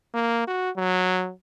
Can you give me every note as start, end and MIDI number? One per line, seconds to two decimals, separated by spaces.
0.14 0.47 58
0.47 0.70 66
0.77 1.32 54